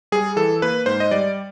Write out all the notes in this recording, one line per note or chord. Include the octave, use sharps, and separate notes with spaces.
G3 G#4
E3 A4
A#3 B4
G#2 C5
D#5
G3 D5